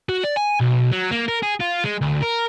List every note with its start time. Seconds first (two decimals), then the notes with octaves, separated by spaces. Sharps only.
0.09 F#4
0.24 D5
0.37 G#5
0.61 B1
0.92 F#3
1.11 A#3
1.28 A#4
1.43 G#4
1.60 F4
1.84 G#3
2.02 D2
2.23 A#4